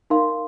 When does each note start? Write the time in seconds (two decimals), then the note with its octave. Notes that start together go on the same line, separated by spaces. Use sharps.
0.10 D#4 A#4 F5 C6